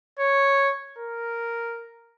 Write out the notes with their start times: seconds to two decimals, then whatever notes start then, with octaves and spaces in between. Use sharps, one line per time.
0.19 C#5
0.98 A#4